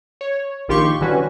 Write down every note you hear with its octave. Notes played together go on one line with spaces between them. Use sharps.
C#5
A#1 D#3 F4 G4 C6 C#6
D3 E3 G3 C#4 F#4 B4